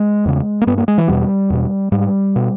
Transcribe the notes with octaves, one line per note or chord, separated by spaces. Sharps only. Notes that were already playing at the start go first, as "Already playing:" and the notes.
Already playing: G#3
E2 C#3
A#3
G2 B3
A#3
G#3
E3
E2 B2 G3
E2 B2
G#2 G3
B2